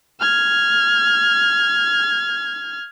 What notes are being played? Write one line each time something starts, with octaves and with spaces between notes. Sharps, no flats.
F6 G#6